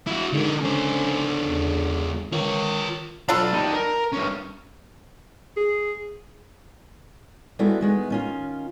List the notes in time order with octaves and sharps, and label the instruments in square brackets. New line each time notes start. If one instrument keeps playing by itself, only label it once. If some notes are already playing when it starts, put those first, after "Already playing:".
[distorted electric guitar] E4 F#4
[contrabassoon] G#2 [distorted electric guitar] D3 A#4 [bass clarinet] D#3
[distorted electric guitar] C#2 C5 [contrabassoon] D3 [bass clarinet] C#4
[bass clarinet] E2
[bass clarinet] D#3 [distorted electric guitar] F4 C#5
[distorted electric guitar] B1 B5 [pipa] D4 F4 A4
[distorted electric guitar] D#4 G4
A#4
G2 C#4
[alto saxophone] G#4
[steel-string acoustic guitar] G3 G#3 B3 E4 F#4 A4
D#3 G#3 B3
D#3 C#4 F4